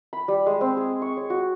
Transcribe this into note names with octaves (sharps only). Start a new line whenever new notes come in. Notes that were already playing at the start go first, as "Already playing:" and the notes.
B5
G3
G#3
C4
G#4
C#6
C#5
F#4